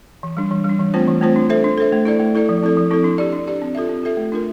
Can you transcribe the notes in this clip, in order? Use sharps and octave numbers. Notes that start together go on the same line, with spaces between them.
E3
G3 D4
E3
G3 D4
E3
A3 C4 F4 C5
E3
A3 C4 F4 C5
D4
A4 C5 E5
D4
A4 C5 E5
A3
E4 A4 D5
A3
E4 A4 D5
F3
C4 E4 A4
F3
C4 E4 A4
D4
G4 D5
D4
G4 D5
C4
F4 A4 E5
C4
F4 A4 E5
A3
D4 F4 A#4